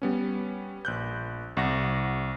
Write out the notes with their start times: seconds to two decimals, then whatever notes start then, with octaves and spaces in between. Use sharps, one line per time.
0.02 G3 B3 C#4
0.85 A#1 F#6 G6
1.57 C2 F#5 A#6